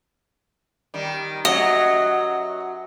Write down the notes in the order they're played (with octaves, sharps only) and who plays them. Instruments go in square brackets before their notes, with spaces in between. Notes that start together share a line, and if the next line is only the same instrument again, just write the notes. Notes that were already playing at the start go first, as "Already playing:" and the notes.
[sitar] D#3 G3
[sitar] F#2 F#3 [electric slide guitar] F#4 [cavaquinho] D#5